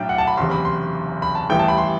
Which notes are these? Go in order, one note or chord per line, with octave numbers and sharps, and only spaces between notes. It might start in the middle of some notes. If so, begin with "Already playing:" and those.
Already playing: B1 A2 F#3 D4 G5
F#5
A5
B5
F#1 E2 C3 C6
B5
C6
B5
A5
A1 G2 E3 A3 G5
A5
B5
C6